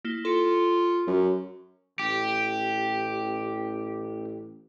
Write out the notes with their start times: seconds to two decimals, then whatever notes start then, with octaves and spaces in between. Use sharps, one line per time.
0.05 A#3 E4 G7
0.25 F4 A4 C#7
1.07 F#2
1.99 A1 G4